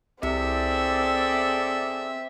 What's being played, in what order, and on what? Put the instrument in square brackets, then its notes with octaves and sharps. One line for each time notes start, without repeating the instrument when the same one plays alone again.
[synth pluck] C2 [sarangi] C4 [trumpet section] G#4 A4 D5 [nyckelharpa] E5